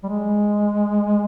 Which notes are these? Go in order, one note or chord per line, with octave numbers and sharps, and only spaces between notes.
G3
G#3